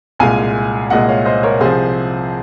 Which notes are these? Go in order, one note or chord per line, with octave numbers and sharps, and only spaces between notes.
C2 A#2 G#3 F5 G#5
C2 A#2 G#3 D#5 F#5
C#5 F5
C5 D#5
A#4 C#5
C2 C3 F3 G#4 C5